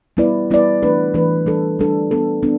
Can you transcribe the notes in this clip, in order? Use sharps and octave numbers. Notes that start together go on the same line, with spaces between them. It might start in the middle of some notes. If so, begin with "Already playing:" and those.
G3 B3 E4 B4 D5
G3 B3 E4 B4 D5
E3 A3 D4 B4
E3 A3 D4 B4
G3 D4 A4
G3 D4 A4
B3 D4 A4
B3 D4